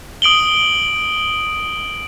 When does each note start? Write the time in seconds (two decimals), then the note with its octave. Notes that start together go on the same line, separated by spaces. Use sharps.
0.22 D#6 D7 F#7 G7